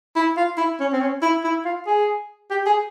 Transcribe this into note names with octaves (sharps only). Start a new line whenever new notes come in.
E4
F4
E4
C#4
C4
C#4
E4
E4
F4
G#4
G4
G#4